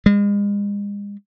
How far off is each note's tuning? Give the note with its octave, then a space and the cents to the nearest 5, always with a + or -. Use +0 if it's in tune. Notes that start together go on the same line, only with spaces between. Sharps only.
G#3 -40